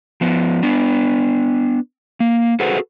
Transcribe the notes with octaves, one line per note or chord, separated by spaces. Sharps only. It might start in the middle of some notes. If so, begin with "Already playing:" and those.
F3 B3
B3 D4
A#3
F#4 G#4 A4 B4 C5 F#5